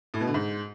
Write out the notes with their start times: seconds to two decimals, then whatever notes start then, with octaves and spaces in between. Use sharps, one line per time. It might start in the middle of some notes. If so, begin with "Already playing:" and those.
0.14 A2
0.21 B2
0.27 D3
0.34 G#2